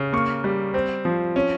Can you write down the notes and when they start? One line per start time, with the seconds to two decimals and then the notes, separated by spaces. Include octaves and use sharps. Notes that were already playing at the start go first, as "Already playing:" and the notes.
Already playing: C#3
0.12 A#3 C#6
0.44 G3
0.74 C4
1.05 F3
1.36 C#4